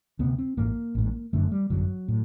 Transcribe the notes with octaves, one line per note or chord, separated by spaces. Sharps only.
D2 C3 B3
C4
A1 G#2 A#3
A1 G#2
G1 F#2 D3 A3
G3
G1 F#2 D3 F#3
A2